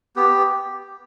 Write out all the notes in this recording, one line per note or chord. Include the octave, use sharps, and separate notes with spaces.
B3 G4